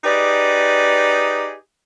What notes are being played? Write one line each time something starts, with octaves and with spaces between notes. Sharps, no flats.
D#4 G4 G#4 B4 D5